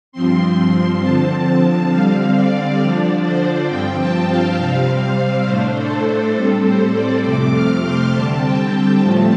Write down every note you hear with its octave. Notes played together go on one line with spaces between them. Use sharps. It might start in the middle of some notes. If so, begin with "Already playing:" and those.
G2 F3 C4 C6
D3 F3 C4 A5
D3 G3 C4 F5
D5
D3 F3 D4 D5
C5
G2 F3 C4 G5
A5
F5
C3 G3 C4 F5
A2 A3 D4 C5
A4
A4
A2 G3 C4 A4
C5
D5
F2 C3 A3 C4 D6
F6
C6
D3 G3 C4 A5
G5
A5
A2 F3 A3 C4